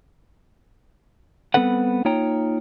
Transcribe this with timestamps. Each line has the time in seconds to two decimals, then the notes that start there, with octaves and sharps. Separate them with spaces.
1.54 G3 B3 C4 A4 B4 F#5
2.05 A#3 D#4 F4 C#5 G5 A#5